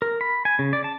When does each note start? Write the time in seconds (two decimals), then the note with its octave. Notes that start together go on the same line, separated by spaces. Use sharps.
0.02 A#4
0.21 B5
0.45 G#5
0.59 C#3
0.73 D5
0.84 A5